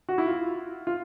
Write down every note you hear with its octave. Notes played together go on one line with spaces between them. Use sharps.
F#4
E4
F4
F4